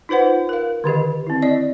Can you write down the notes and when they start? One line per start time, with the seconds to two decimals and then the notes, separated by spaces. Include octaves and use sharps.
0.09 D#4 F4 B4 C5 F#5
0.49 A#4 F5
0.84 D3 D#3 G4 D#5
1.27 C4 E4
1.42 D5 D#5